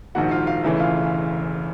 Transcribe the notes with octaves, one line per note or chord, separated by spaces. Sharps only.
A#1 G#2 D#3 F#4 F#5
F4 F5
F4 F5
E1 E2 C#3 E3 A3 E5
F4 F5